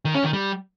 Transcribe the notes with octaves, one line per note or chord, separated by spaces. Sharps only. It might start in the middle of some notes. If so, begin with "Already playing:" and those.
D#3
C#4
D#3
G3